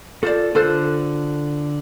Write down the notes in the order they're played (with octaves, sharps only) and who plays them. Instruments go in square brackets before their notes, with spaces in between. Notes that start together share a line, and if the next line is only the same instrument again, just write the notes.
[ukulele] F4 C5 D5 [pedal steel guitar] A4
[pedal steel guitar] D3 F#6 [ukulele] F4 A4 C5